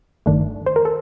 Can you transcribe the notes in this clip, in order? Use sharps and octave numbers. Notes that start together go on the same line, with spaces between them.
G1 G2 D#3 A3 D4
C5
A#4
A4